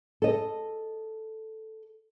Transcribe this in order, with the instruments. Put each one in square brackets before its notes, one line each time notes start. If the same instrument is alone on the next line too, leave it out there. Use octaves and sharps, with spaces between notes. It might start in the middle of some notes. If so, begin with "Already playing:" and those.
[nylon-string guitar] A4 D#5